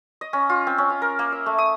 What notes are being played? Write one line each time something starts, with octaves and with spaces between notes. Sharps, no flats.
D#5
C#4
F4
C4
C#4
F5
A#4
A#3
E5
A3
D#6